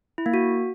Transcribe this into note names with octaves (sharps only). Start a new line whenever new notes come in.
E4
A#3
F#4